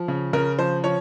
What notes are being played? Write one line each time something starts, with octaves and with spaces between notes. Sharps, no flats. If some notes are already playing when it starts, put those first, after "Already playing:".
Already playing: F3
C#3
C#3 A#4
F3 C5
F3 C#5